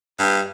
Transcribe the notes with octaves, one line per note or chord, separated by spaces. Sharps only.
G2